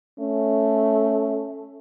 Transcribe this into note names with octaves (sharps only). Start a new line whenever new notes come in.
A3 C#4